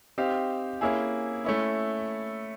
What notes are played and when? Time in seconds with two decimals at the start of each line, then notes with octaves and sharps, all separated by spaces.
0.18 C4 D#4 G4 C5 F5
0.81 A#3 C#4 E4 G#4
1.44 A3 C#4 E4